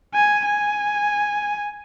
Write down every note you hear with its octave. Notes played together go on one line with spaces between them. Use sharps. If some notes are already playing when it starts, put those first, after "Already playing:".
G#5
G#5